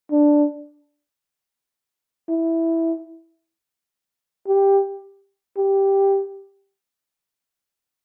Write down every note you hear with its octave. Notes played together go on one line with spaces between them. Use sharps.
D4
E4
G4
G4